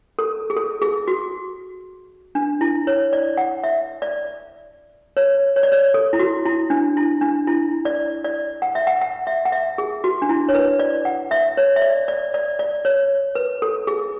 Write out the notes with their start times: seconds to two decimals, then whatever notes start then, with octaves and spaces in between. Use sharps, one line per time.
0.19 A4
0.50 G#4
0.57 A4
0.82 G#4
1.08 F#4
2.35 D4
2.61 E4
2.87 C#5
3.13 D5
3.37 F#5
3.64 E5
4.02 D5
5.17 C#5
5.56 C#5
5.63 D5
5.72 C#5
5.94 A4
6.13 E4
6.19 F#4
6.45 E4
6.70 D4
6.97 E4
7.21 D4
7.47 E4
7.85 D5
8.24 D5
8.62 F#5
8.75 E5
8.87 F#5
9.01 F#5
9.27 E5
9.45 F#5
9.52 E5
9.78 G#4
10.04 F#4
10.22 D4
10.29 E4
10.49 C#5
10.55 B4
10.79 D5
11.05 F#5
11.31 E5
11.57 C#5
11.76 E5
11.82 D5
12.08 D5
12.34 D5
12.59 D5
12.85 C#5
13.35 B4
13.62 A4
13.87 G#4